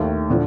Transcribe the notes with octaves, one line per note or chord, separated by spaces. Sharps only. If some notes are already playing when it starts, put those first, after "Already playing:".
Already playing: D#2 D#3 A3
D3 F3